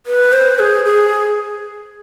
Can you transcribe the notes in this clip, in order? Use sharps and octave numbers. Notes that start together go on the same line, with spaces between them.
B4
C5
G#4
G#4